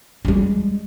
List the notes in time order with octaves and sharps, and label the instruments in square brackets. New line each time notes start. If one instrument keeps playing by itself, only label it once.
[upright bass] G3 G#3